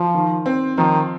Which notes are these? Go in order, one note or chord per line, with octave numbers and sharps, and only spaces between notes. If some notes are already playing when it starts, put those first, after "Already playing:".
Already playing: F3 F4
D#3
C4
D#3 F3